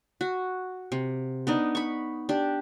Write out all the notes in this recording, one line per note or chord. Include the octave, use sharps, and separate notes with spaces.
F#4
C3
B3 D4 D#4
B5 C#6
D4 G4